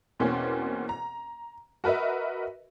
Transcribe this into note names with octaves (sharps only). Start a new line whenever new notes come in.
E2 B2 A#3 C4 C#4
A#5
F#4 A#4 B4 D#5 E5